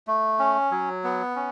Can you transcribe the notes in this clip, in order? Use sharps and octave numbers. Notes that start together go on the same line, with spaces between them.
A3
C#4
F#3
B3
C#4